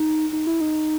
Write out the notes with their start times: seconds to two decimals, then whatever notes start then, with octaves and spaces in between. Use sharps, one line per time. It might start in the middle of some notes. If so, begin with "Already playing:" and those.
Already playing: D#4
0.33 D#4
0.47 E4
0.61 D#4